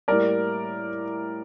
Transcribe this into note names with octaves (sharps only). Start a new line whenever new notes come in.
A2 G3 A#3 A#4 D5